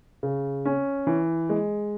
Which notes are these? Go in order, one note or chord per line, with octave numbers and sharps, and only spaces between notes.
C#3
C#4
E3
G#3